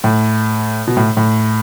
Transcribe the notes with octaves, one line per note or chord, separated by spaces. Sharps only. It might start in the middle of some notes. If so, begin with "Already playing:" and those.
A2
B2
A2
A2